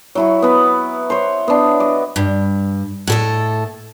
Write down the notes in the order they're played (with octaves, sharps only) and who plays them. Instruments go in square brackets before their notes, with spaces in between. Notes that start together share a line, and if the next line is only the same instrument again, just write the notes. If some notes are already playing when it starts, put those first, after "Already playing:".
[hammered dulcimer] F#3 E4 C#6
B3 B4
C5 C#5
B3 D4
D#5 D6
[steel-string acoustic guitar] G2
A2 A4 D#5